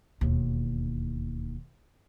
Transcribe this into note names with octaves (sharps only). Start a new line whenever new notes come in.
E1 D#2